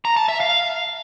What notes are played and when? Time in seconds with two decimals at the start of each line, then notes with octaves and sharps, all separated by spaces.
0.05 A#5
0.17 A5
0.29 E5
0.40 F5